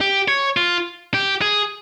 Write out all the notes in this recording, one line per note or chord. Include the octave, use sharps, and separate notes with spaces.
G4
C#5
F4
G4
G#4